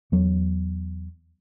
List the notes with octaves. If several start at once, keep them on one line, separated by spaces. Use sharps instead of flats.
E2 F#3